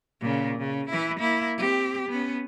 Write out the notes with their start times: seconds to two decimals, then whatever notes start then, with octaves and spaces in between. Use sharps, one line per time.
0.21 A#2 C#3
0.59 C#3
0.89 E3 E4
1.19 A#3 E4
1.58 C4 G4
2.08 B3 C#4